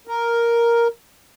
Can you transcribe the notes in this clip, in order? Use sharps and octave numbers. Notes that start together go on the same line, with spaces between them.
A#4